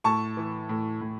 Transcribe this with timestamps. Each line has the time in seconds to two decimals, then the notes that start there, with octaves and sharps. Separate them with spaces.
0.04 A2 A5 C#6
0.37 E3
0.69 A2
1.01 A2